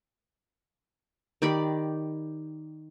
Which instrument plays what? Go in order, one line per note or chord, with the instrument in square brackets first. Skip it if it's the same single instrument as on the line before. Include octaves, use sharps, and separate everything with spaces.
[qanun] D#3 G4 D5 B5